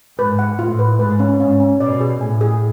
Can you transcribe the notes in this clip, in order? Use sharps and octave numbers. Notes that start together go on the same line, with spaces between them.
G#2 B4
F#5
A2 F4
B4
G#2 B4
C#4
G#2 C#4
C#4
B2 D5
G#4
A2 G#5
G#4